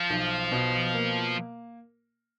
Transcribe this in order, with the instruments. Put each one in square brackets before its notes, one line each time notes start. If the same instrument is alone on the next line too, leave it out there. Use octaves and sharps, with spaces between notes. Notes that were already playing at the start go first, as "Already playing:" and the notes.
Already playing: [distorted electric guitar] F3
[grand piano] B1
B2
A#3